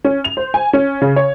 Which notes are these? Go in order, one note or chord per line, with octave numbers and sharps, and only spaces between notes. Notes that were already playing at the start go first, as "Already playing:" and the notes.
C#4
F7
C5
G#5
C#4
C#3
C#5